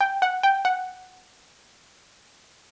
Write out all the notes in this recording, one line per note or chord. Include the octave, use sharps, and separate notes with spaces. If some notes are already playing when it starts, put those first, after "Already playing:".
G5
F#5
G5
F#5